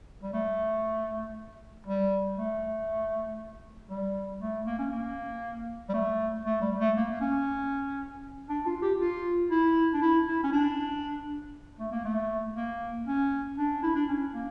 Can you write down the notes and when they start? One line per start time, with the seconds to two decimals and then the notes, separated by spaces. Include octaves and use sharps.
0.23 G3
0.34 A3
1.87 G3
2.38 A3
3.90 G3
4.42 A3
4.66 A#3
4.79 C#4
4.91 A#3
5.89 G3
5.94 A3
6.46 A3
6.61 G3
6.79 A3
6.96 A#3
7.11 A#3
7.21 C#4
8.49 D4
8.66 F4
8.82 G4
9.00 F4
9.51 E4
9.93 D4
10.02 E4
10.27 E4
10.44 C#4
10.53 D4
11.79 A3
11.92 A#3
12.05 A3
12.56 A#3
13.07 C#4
13.58 D4
13.83 E4
13.95 D4
14.09 C#4
14.34 A#3